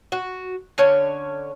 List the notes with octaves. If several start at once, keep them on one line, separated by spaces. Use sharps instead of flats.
F#4
D3 C#4 C#5